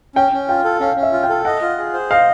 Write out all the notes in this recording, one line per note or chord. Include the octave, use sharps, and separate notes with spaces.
C#4 G5
C#4
F4 G5
A4
C#4 F5
C#4
E5
F4
G5
A4
D#5 F#5
F4
G#4
C5
D#5 F5